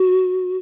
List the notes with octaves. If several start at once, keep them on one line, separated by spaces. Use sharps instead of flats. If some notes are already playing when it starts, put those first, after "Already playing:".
Already playing: F#4